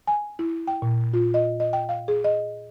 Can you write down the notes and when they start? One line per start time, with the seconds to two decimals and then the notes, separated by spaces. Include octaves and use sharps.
0.07 G#5
0.39 E4
0.67 G5
0.82 A#2
1.13 F4
1.34 D#5
1.60 D#5
1.73 G5
1.89 F5
2.08 G#4
2.24 D#5